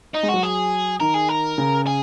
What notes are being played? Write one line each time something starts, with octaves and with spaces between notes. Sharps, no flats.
D#4
G#3
F#4
F#3
G#4
D#3 A#4
G#4
A#4
C#3
G#4